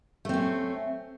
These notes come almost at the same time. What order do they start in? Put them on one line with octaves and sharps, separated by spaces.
A3 C4 C#4